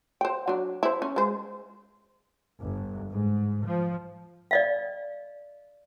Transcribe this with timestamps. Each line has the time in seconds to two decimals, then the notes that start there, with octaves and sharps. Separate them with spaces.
0.21 C5 G5
0.48 F#3 D4
0.83 E4 C5
1.02 C#4
1.16 G#3 C5
2.61 G1
3.09 G#2
3.64 F3
4.51 D5 D#5 F5